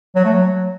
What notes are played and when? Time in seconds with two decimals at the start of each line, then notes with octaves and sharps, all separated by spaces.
0.15 F#3
0.25 A3
0.34 F#3